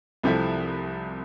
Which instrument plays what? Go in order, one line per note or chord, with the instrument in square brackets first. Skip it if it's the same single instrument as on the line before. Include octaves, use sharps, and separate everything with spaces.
[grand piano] C2 C3 F3 A3 E4